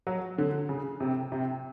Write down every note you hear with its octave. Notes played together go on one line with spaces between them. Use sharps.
F#3
D3
C#3
C3
C3